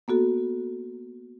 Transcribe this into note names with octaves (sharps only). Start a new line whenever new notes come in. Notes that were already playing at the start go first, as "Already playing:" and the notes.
A#3 B3 F#4 A4